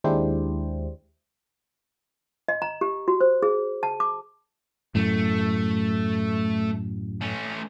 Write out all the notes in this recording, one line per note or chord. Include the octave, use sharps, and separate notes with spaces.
D#2 G#3 D4 E4 G4 C5
D#5
A#5
G4
F#4
C5
G#4
A5
D6
F#2 A2 A3
A3 C#4